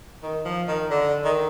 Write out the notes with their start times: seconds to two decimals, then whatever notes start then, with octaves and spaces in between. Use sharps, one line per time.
0.23 D#3
0.45 F3
0.68 D#3
0.91 D3
1.25 D#3